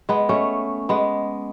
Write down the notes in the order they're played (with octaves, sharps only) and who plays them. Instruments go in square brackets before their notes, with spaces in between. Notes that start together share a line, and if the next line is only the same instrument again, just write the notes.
[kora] G#3 B3
A3 C#4
G#3 B3